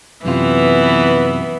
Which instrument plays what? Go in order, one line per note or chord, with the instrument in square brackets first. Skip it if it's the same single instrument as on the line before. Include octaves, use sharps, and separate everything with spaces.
[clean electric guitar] F#2 C3 F4 [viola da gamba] E3 B3